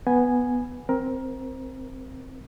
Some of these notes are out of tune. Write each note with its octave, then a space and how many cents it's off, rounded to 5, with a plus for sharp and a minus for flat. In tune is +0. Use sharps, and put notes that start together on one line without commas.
B3 +0 G#5 +0
C4 +0 A#4 +20